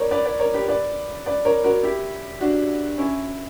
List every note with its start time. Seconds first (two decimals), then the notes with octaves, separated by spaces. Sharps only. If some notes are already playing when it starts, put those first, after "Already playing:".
Already playing: A#4 B4 C#5 D5
0.11 B4 D5
0.25 B4 D5
0.40 A#4 C#5
0.54 G4 B4
0.68 B4 D5
1.26 B4 D5
1.45 A#4 C#5
1.64 F#4 A#4
1.83 E4 G4
2.41 D4 F#4
2.98 C#4 E4